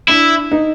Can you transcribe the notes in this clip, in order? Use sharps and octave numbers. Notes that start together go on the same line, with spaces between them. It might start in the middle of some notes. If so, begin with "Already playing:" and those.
D4 E4
D#4